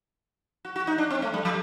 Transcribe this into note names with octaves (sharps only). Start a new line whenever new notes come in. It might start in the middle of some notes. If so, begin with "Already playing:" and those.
F#4
F#4
D#4
D4
C4
A3
G3
F#3